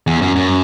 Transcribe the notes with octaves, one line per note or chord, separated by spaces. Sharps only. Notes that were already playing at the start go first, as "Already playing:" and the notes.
E2
F#2
F#2